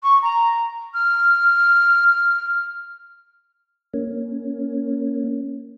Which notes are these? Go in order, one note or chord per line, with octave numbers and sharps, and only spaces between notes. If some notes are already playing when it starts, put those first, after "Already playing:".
C#6
A#5
F6
A#3 C#4